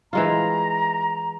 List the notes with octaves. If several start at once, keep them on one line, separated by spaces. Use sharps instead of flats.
E3 G#3 F4 A#5